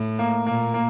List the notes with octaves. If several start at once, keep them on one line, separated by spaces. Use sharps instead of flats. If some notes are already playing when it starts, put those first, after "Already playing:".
Already playing: A2
A#3
A#2 A#3
A#3